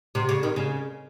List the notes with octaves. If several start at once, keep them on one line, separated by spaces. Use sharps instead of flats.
C3
C#3
D#3
C#3